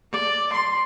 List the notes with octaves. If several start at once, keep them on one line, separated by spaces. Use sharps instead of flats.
D5
C6